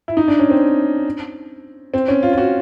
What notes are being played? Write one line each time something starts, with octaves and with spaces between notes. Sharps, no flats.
E4
D#4
D4
C#4
C4
C4
C#4
F4
F4
F#4